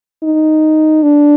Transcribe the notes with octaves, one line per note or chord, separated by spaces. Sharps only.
D#4
D4